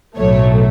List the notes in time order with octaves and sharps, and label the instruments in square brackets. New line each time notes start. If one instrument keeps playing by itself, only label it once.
[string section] B1 A2 F#3 A3 C#5